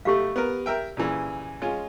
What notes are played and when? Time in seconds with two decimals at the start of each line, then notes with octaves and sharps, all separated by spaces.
0.05 B1 A3 G4 F5
0.36 B3 A#4
0.66 A#4 E5 G5
0.97 A#2 C#3 E3
1.62 G#3 C#4 F4